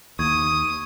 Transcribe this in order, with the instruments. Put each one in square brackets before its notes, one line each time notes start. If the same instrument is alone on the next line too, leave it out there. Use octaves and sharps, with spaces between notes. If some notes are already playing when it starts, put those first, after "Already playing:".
[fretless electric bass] D#2 [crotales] C#6 G#6 [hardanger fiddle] D#6